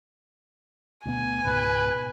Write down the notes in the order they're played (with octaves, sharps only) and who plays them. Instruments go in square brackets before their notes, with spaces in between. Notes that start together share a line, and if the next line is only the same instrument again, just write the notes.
[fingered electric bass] D2 B2 B3 [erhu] G#5
[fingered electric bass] C#2 G#2 B2 [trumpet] B4